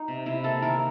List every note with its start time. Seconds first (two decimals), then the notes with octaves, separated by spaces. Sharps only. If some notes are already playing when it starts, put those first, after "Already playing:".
Already playing: D#4
0.08 C3
0.26 C3 E4
0.44 A#3 A4
0.62 D#3 A#4